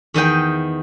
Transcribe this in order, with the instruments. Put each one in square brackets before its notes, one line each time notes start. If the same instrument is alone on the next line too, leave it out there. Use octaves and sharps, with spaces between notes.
[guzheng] E2 D#3 D#5 G5